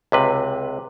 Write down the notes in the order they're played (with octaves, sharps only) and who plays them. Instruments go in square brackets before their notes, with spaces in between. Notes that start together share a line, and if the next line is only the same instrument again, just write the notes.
[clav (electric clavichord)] C#2 C3 B4